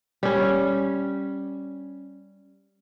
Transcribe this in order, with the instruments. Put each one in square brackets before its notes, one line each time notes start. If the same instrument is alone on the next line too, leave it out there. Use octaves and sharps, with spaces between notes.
[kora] G3 C#4